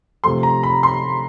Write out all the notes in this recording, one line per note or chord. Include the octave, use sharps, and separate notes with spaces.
C3 F3 A3 C6
A#5
B5
C6